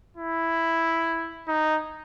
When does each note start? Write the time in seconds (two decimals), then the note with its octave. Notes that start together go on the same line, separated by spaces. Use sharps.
0.17 E4
1.48 D#4